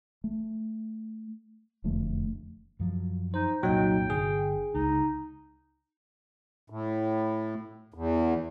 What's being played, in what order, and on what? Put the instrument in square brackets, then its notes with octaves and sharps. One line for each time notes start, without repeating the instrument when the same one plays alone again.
[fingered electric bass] A3
E1 F2 D3 A3
[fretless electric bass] F#2 F3 F#3
[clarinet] D#4 [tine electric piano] C5
[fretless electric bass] C2 F#2 A#2 [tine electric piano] F#3 D#4 [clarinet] G5
[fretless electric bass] G1 D3 [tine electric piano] G#4
[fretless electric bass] C#2 [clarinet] D#4
[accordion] A2
E2